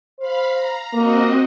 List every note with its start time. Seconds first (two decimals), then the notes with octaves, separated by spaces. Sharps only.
0.19 C5 F5 B5
0.52 A#5
0.94 A#3 C4 F#4 D#5